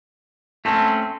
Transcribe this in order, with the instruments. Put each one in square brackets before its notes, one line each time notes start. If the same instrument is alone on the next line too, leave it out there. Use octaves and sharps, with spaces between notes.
[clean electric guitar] A3 C4 C#4 [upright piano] A5